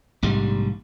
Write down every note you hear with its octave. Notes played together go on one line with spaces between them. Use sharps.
A#1 G#2 C3 G3